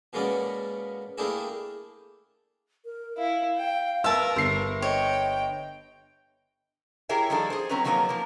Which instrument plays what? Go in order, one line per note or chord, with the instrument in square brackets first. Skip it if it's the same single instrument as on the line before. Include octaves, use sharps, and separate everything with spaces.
[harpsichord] B2 G#3 A#3 B3 C#4 D5
A3 A#3 D4 E4 G4 G#4
[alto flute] A#4
[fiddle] E4 [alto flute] F5
[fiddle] G5
[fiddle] A#4 B4 [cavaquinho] E5 A5 [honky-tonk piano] E6
[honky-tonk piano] G1 C7
[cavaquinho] C#5 [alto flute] D#5 [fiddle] G5
[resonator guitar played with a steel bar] E4 G4 G#4 A#4 C#5 E5
D#3 F3 G3 D4 G#4 A4
G#4 C5
F#3 C4 C#4 B4 A#5
D#3 F3 F#3 A#3 D4 C#5
F3 A#3